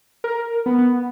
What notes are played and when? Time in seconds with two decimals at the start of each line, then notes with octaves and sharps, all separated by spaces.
0.24 A#4
0.66 B3
0.78 B3